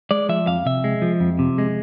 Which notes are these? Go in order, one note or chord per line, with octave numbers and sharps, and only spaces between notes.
G#3 D5
F3 E5
F2 F5
C3 E5
G#3
F3
F2
C3
G#3